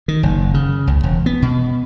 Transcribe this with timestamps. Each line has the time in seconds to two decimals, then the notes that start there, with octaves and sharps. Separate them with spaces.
0.08 D#3
0.23 F#1
0.54 C#3
0.87 C#2
1.03 E1
1.26 B3
1.42 B2